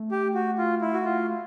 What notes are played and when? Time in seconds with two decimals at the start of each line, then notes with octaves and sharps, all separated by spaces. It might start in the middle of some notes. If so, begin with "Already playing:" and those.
Already playing: A3
0.11 G4
0.34 F#4
0.58 F4
0.81 E4
0.93 F#4
1.05 F4